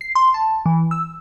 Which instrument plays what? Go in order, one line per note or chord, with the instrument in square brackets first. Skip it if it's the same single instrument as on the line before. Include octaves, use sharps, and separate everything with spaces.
[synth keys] C7
C6
A5
E3
E6